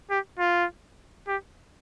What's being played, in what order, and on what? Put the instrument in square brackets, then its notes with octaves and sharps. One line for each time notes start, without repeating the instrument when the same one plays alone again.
[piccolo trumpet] G4
F4
G4